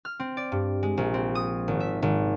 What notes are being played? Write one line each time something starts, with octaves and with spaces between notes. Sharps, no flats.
F6
C4
D5
G2
G#3
A#1
C4
D#6
G#1
E5
G#1